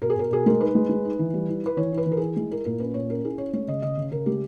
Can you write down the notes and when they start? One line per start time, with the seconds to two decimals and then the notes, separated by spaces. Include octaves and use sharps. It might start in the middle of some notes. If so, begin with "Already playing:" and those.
0.02 B2 A#4
0.10 G#4
0.16 B2 A#4
0.30 B2 G#4
0.46 G#3 A#4
0.61 D#4 B4
0.75 G#3
0.89 G#3
1.05 D#4
1.19 E3
1.34 G3
1.49 E4
1.63 E4 B4
1.77 E3 C#5
1.92 E4
1.98 B4
2.06 E3
2.12 A#4
2.17 E4 G#4
2.36 G#3 G#4
2.51 E4 A#4
2.65 A#2 A#4
2.80 C#4 B4
2.94 A#2 C#5
3.10 C#4 A#4
3.25 E4 G#4
3.38 C#4 C#5
3.53 G#3 C#5
3.68 C#3 D#5
3.82 C#3 D#5
3.97 C#3
4.11 C#3 A#4
4.26 G#3 G4